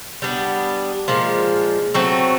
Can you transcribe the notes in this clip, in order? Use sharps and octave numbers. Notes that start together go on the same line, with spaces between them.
G3 B3 D4
A#2 F3 G#3
F#3 A3 C4